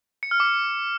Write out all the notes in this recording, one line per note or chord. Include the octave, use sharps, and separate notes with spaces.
C#7
F6
D6